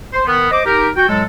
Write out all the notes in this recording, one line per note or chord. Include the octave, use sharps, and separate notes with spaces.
C5
D#3 B3
C5 D#5 D6
D#4 G4 A#4
F#4 G5
A2 F#3 G#3 A4